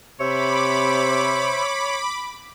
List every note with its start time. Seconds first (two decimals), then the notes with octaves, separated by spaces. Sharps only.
0.20 C3 C5 C#5 E5 B5 D6